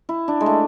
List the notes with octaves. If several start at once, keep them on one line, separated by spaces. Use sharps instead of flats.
E4
D4
G#3
A3